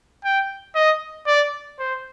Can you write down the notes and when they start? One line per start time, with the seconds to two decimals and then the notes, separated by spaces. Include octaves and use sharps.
0.24 G5
0.75 D#5
1.27 D5
1.79 C5